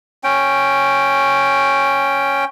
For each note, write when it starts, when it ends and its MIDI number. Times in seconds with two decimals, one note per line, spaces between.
0.24 2.45 61
0.24 2.45 79